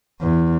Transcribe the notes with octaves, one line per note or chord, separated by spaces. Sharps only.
E2